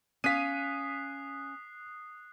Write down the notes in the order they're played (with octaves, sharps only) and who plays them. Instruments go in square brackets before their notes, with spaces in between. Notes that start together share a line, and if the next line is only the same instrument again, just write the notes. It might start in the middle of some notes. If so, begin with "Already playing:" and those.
[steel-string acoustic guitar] C#4 F5 [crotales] D#6 F#6 C7 [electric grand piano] B6 D#7